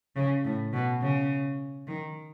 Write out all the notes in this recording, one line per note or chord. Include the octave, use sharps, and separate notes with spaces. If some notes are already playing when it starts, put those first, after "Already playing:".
C#3
A2
B2
C#3
D#3